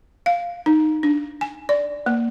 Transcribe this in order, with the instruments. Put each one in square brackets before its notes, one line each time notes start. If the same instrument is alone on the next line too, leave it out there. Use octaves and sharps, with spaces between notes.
[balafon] F5
D#4
D4
G#5
D5
A#3